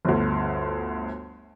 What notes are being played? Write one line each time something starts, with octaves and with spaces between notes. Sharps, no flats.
G1 D2